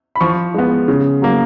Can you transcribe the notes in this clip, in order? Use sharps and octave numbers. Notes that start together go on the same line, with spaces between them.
B5
F3 C#6
G#3 B3
C#3
F#3 A#3